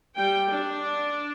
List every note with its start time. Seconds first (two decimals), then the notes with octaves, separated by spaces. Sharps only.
0.16 G3 G5
0.49 D4